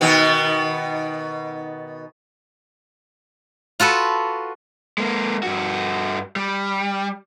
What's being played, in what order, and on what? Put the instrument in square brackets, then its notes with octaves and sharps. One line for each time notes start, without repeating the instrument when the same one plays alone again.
[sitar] B2 D#3 B3
[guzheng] F4 F#4 A4 B4
[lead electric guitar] G#3 A#3
G2 F#4
G3